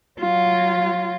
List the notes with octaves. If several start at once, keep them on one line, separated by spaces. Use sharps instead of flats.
F#3 F4